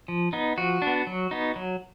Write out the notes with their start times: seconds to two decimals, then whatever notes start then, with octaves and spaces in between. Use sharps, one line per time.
0.08 F3
0.33 B3 D#4
0.58 F3 F#4
0.82 D4
0.87 B3
1.07 F#3
1.31 B3 D#4
1.56 F#3